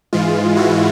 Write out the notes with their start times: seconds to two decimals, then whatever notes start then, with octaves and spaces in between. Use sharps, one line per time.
0.13 G#2 E3 G#3 F4
0.56 E4 F#4